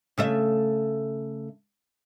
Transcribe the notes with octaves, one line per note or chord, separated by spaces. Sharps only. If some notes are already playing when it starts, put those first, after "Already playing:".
C#3 A3 E5